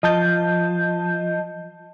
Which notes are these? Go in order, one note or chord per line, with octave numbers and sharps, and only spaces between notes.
F3 D#5 A5 G6